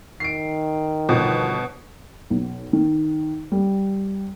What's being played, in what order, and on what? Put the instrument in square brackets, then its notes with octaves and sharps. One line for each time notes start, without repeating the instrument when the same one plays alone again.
[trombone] D#3 [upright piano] C7 D7
[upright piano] G1 F3 [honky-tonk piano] B2
[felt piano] B1
D#3
G3